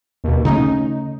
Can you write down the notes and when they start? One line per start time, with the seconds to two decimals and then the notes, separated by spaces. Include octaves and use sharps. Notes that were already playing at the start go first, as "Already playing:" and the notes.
0.24 D#2 B2
0.45 C#3 A3 C#4 D#4